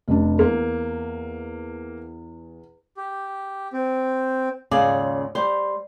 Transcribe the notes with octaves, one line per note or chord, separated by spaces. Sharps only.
F1 G3 D4
E2 A#3
G4
C4
D#2 G#2 C#3 F4 G#4 D5
G3 C5